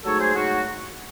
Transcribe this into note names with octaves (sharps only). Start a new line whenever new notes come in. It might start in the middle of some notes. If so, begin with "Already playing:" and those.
G#2 F#3 A3 A4 C#5
G#4 C5
G#2 F#3 A3 F#4